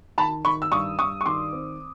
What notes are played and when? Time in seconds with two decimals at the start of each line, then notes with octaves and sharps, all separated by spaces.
0.18 D#3 A5 B5
0.45 D#3 B5 C#6
0.62 E6
0.72 G2 C#6 D#6
0.98 G2 C#6 D#6
1.21 C#6
1.25 D#3 C6 D6
1.53 C4